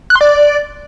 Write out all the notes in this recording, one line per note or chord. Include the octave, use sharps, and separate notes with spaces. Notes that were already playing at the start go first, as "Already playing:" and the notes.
F#6
C6
D5